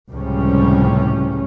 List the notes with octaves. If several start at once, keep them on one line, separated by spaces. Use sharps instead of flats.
C#2 A2 C3 F3 G3 C#4